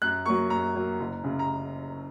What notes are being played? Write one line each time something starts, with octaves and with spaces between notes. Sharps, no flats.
F#2 F#6
F#3 A#3 C#6
F#2 A#5
F#3 A#3
F#1
F#2 C#3
A#5